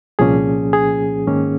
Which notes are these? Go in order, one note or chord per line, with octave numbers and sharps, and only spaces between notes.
C2 A#2 F3 A#3 C#4 G#4
G#4
G#2 D#3 A#3 C#4